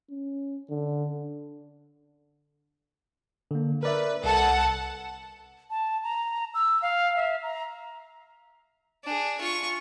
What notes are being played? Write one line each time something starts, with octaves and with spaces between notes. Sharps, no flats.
C#4
D3
D3 A#3
A#4 B4 D5 E5
C2 A4 F#5 A5
A5
A#5
E6
F5
E5
A#5
D4 G#4
F4 C#6